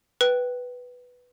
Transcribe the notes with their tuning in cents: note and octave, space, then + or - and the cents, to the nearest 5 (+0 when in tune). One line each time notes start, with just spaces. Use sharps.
B4 +0 G5 -20